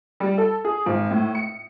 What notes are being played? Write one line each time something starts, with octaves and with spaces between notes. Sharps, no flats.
G3
A4
G#4
G#1
A2
C#7